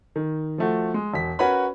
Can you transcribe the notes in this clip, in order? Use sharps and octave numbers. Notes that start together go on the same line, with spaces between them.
D#3
F3 A3 F#4
G#3
E1 B6
C#4 F#4 A#4 B4 C#5 B5